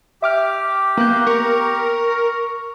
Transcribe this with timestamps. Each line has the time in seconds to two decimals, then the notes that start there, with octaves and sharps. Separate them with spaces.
0.22 G4 E5 D6 F6
0.97 A#3 B3 F#6 G6
1.27 A#4 C#6